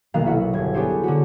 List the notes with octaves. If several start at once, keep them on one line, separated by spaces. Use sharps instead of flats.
F1 B1 D#3 A#3 F5 F#6
E4 F#4 B4 F#5
G1 G#6
B3 D4 G4 G#4 C5 C#5
D3 B3 F#4